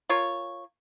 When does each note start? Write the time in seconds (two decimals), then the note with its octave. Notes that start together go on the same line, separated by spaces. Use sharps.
0.09 F4 A#4 C#5